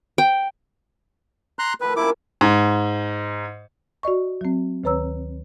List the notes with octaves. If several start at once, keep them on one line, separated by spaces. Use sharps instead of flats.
G5
A#5 C6 F#6
D#3 F3 A3 B4
C3 A#3 C#4 E4 D6
G#2
F#4 D5 D#5 C#6
F#3 C4
D2 D#3 B4 C#5 A#5 E6